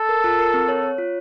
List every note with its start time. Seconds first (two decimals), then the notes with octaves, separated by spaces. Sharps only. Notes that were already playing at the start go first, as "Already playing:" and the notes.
Already playing: A4
0.09 A#4
0.24 F4
0.39 A#4
0.54 C4
0.68 C#5
0.83 C#5
0.98 F4